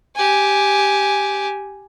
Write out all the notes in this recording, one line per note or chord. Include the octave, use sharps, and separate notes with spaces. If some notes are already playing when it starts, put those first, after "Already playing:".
G4 G#5